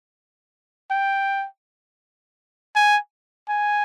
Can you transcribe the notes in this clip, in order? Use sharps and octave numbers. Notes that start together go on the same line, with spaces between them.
G5
G#5
G#5